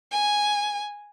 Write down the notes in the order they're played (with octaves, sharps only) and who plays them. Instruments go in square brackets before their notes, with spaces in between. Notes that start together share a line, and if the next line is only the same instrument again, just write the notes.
[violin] G#5